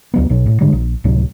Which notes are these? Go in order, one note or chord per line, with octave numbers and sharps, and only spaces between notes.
D2 F#3 B3
B1 B2 F#3
A2
G#2 D3 G3 G#3
A#1
C#2 A2 C3 F#3